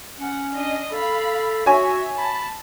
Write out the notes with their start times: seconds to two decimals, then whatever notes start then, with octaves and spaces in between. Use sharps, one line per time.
0.19 C#4 F#5
0.51 D4 D#5
0.92 A4 F5 B5
1.66 F#4 C#5 E5 G#5 C#6
2.18 A5 B5